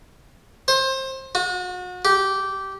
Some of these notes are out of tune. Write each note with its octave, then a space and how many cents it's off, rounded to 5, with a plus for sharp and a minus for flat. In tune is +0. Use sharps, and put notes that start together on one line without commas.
C5 +25
F#4 -35
G4 -15